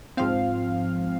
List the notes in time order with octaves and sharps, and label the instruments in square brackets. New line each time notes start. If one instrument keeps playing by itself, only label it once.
[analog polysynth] G#2 F3 C4 F5